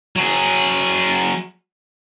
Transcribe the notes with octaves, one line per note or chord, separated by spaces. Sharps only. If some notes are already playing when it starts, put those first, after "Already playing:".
F#3 G#4